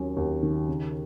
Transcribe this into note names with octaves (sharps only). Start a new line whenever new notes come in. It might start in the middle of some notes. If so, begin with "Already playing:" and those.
Already playing: D#2 D#3 F#3 C#4
D#2
D#3
C#3